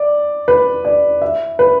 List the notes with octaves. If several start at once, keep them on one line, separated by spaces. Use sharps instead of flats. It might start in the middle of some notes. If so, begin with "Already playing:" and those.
Already playing: D5
B4
D5
E5
B4